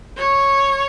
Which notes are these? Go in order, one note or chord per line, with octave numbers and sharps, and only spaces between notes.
C#5